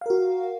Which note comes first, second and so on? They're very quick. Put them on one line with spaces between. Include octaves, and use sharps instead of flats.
F5 A#4 F#4